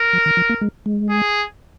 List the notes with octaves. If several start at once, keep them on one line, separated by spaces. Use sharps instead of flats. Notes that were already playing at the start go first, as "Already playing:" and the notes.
Already playing: A#4
F3
D#3
F3
A#3
G#3
G#3
G#4